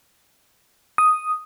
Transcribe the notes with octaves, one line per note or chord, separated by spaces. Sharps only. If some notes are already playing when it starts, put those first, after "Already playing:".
D#6